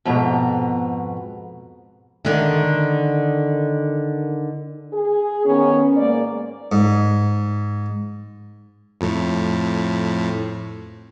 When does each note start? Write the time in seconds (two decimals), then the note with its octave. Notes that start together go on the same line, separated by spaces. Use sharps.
0.05 F2 G#2 B2 A#5
2.25 D3 D#3
4.93 G#4
5.46 D#3 B3 C#4
5.97 G#2 A#3 D5
6.72 G#2
9.01 F2 A2